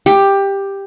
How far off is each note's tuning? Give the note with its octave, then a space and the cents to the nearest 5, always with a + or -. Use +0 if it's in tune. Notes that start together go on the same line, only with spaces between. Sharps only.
G4 +10